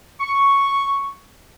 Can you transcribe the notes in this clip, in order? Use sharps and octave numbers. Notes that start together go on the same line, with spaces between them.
C#6